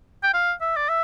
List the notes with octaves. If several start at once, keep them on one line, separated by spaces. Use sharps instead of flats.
G5
F5
E5
D5
E5